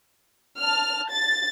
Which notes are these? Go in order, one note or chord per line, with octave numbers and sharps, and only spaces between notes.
A5 F6
A6